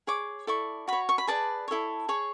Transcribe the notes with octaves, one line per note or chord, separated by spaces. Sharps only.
G#4 C#5 D6
E4 A4 D5 C#6
F#4 C#5 B5
C#6
B5
G#4 B4 D5 A5
E4 A4 C#5
G#4 C#5